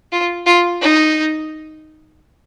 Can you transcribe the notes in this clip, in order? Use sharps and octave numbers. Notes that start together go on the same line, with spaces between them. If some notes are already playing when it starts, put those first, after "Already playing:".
F4
F4
D#4